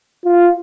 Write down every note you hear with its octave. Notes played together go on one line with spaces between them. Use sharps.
F4